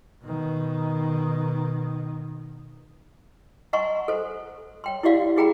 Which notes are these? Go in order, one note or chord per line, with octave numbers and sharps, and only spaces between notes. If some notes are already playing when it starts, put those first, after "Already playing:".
B2 D#3
D#5 F#5 G#5 A#5 C6 C#6
A4 C5
C#5 G5 C6
E4 F#4 G4 D5 F5 F#5
E4 F#4 G#4 G5 A#5 B5